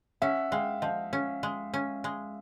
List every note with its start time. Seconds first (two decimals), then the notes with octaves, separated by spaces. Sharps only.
0.22 C#4 E5 F#5
0.51 G#3 F5 G5
0.82 F3 D#5 F5
1.13 C#4
1.43 G#3
1.74 C#4
2.04 G#3